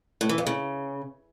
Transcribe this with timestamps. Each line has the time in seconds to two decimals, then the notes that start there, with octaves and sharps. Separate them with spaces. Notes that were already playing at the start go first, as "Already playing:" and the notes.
0.21 A2
0.29 E3
0.38 F2
0.47 C#3